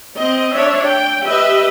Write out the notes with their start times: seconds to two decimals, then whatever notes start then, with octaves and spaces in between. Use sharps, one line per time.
0.17 C4 D#5
0.54 D4 C#5 E5
0.85 G5
1.27 G4 B4 D#5 E5